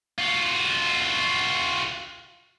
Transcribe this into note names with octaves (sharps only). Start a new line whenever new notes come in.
F4 F#4